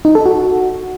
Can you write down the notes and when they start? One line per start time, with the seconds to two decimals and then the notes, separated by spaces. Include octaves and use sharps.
0.05 D#4
0.15 A4
0.26 F#4